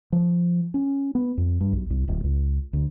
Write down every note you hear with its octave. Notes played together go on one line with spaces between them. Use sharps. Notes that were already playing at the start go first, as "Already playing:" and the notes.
F3
C#4
B3
F2
G2
B1
C2
D1
C#2
D2